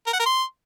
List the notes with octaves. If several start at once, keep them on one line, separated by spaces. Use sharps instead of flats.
A#4
F#5
A#4
C6